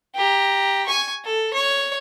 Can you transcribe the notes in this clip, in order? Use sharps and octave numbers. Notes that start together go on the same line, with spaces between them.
G4 A#5
G#5 C#6
A4
C#5